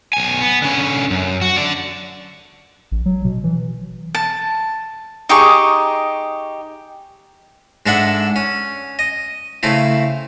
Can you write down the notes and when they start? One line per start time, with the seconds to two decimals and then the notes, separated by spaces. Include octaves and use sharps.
0.13 B1 G#5
0.41 B3
0.62 D3 C#4
1.10 F#2
1.42 F#4
1.56 D3 D5
2.92 A1
3.06 F#3
3.25 B2
3.44 E3
4.15 A5
5.29 D#4 G4 G#4 C#6
7.86 G#2 G#3 D4 A4 E5 F#5
8.36 C#4
8.99 D#5
9.63 C#3 A3 C4 E4